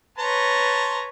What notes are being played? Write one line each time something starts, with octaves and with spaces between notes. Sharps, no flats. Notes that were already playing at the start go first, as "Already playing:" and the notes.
B4 C#5 A5 A#5 C6